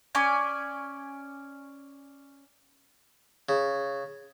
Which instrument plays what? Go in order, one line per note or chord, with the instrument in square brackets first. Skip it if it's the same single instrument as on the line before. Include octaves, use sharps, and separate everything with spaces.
[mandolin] C#4 D5 G#5
[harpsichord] C#3